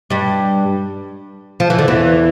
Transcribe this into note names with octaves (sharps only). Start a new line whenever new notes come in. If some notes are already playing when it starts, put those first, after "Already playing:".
G2 G3
F3
E3
D3
E2 E3